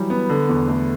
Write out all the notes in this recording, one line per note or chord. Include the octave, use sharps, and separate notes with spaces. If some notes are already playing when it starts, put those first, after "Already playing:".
Already playing: E3 F#3 G3
B3
D3
E2
A3